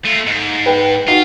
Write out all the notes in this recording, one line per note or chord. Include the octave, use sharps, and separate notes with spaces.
A3 F4
G#2
B4 G5
D#4 F4 F#4